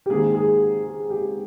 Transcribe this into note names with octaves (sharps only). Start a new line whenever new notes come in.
G4
G#2 D#3 A#3 G#4
G#4
G#4
G4